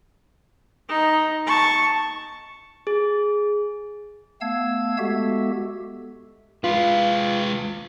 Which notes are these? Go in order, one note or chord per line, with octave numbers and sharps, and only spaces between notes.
D#4
A5 C#6
G#4
A3 B3 F5 A5 E6 G#6
G#3 B3 F#4 G4 A4 E5
G#3 F4 B4